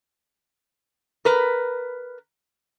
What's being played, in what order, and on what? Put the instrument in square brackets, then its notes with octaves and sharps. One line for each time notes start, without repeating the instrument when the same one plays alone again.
[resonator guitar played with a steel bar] A#4 B4